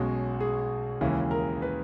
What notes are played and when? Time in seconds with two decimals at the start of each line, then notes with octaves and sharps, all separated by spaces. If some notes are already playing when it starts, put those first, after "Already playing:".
Already playing: B1 B2 G#3 C#4 F#4
0.40 G#4
1.01 D#2 C#3 E3 G#3
1.31 A#4
1.62 B4